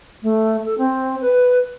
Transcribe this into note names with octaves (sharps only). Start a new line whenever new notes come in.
A3
A4
C4
B4